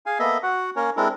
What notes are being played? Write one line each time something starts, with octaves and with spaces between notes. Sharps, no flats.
G#4 F5 G#5
A#3 B3 A4 D#5 E5
F#4 F#5
A#3 C#4 A#4 C#5
G#3 C4 D4 E4 A4 A#4